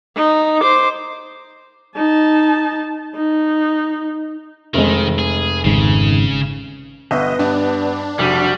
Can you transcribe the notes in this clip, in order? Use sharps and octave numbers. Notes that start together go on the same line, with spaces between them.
D#4
C5 D6
D#4 A5
D#4
F1 D#3 G#3
G#4
G#1 G#2 C#3
G1 B3 D#5 E5
G2 D4
F1 G3 F#4 B6 D#7